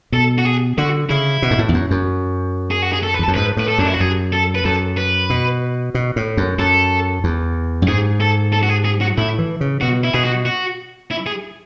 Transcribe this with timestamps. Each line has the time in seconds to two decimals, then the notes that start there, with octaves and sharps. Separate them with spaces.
0.12 B2 A4
0.38 F#4
0.45 G#4
0.78 D3 F#4
1.10 C#3 E4
1.42 B2
1.51 G#2
1.59 A2
1.69 E2
1.74 F#2
1.91 F#2
2.71 G#4
2.82 F#4
2.93 G#4
3.03 A4
3.14 B4
3.19 E2
3.23 A4
3.28 F#2
3.35 G#2 B4
3.57 A2 B4
3.68 A4
3.78 F#2 D4
3.86 E4
3.94 F#4
4.00 F#2 G#4
4.33 A4
4.55 B4
4.65 F#2 A4
4.97 B4
5.30 B2
5.95 B2
6.16 A2
6.37 F#2
6.59 F#2 A4
7.24 E2
7.82 F#2
7.88 G#2 G#4
8.20 A4
8.53 A4
8.63 F#4
8.69 G#4
8.85 G#4
9.01 F#4
9.18 A2 E4
9.39 E3
9.61 C#3
9.81 B2 F#4
10.04 E4
10.13 B2 G#4
10.24 F#4
10.46 F#4
11.11 E4
11.27 G#4